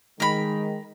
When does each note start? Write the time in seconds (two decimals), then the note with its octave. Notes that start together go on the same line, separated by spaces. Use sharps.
0.20 D#3 G#3 A#4 B5